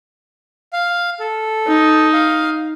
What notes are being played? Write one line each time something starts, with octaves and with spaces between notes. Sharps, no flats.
F5
A4
D#4
F5